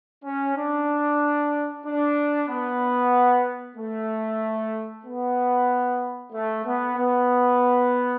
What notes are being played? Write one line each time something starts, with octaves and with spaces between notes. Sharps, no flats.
C#4
D4
D4
B3
A3
B3
A3
B3
B3